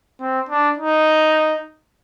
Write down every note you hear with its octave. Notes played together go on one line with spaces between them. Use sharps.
C4
D4
D#4